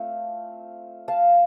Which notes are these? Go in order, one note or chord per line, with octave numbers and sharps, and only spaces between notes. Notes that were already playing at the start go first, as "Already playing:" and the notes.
Already playing: A3 C4 F4
F5 A5